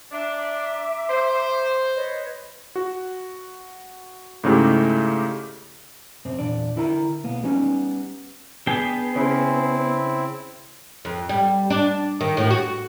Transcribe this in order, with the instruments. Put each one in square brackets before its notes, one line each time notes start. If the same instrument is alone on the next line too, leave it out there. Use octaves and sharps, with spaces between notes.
[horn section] D4 [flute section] E5 A#5 D6
[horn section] C5
[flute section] B4 C#5 D#5
[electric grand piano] F#4
G#2 C#3 A3 E4 G4
[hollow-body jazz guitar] F#2 C3 C4
E2 A#2 D4 D5
D3 E4 A#4 A#5
B1 A#3 B3
G3 B3 C#4 D#4
[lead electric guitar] B3 [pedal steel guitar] D4 G#4 G5
[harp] C#3 [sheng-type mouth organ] C4 E4
[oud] F2
G3
D4
D#3
A2
F#4